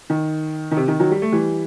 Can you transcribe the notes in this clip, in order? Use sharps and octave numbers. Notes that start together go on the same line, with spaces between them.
D#3
D#3
C3
D#3
D#3 F#3
G3
A3
E3 G3